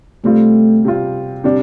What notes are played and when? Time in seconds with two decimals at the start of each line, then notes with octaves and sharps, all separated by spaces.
0.24 C3 G3 A3 C4 F4
0.85 C3 G3 C4 F4
1.44 C3 G3 D4